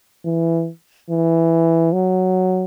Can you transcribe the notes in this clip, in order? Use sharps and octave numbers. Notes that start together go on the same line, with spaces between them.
E3
E3
F#3